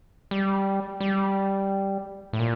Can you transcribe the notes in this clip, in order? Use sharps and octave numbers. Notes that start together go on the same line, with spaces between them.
G3
G3
A2
A#2